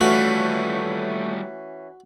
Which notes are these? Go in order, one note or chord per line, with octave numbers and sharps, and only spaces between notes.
E3 G3 A3 C#4 F4 F#4